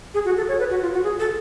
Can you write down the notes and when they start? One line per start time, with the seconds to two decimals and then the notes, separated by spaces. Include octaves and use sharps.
0.14 G#4
0.25 F#4
0.37 A4
0.48 C#5
0.59 B4
0.70 F#4
0.82 F4
0.93 F#4
1.04 G#4
1.20 A4